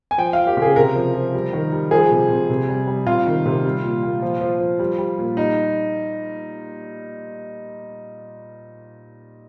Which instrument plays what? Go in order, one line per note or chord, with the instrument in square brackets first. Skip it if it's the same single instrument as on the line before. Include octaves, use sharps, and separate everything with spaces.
[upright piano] G#5
F3 G5
F3 F5
G4
C#3 G#4
C3 A#4
F3
F3
G3
D#3
G3
F3 G#4
C3
C3
C3
G3
G3
C3 F4
D#3
C3
G3
A#2
A#2
F3
F3
F3
G3
G3
A#2
G3 D#4